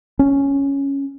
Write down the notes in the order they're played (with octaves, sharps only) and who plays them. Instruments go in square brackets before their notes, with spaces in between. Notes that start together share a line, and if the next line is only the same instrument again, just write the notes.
[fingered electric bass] C#4